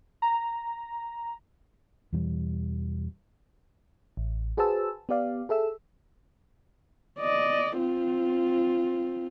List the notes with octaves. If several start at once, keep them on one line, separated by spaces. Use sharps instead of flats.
A#5
E2 B2 E3 G3
A1
F#4 G#4 B4 C5 A5 E6
B3 G4 D5 F5
G#4 A4 E5 E6
D5 D#5
C4 F4